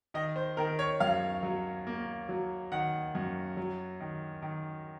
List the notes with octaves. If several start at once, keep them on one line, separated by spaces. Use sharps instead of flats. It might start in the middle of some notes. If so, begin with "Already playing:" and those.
D#3 D#5
C5
D#3 A#4
C#5
F#2 F5
F#3
A#3
F#3
D#3 F#5
F#2
F#3
D#3
D#3